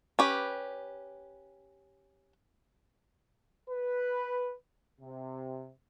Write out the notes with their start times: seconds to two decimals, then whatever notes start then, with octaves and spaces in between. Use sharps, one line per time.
0.19 C#4 G4 B4
3.70 B4
5.01 C3